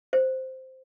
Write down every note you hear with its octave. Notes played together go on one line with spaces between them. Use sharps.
C5